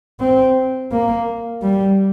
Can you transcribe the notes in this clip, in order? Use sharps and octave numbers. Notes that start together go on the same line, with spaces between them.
C4
A#3
G3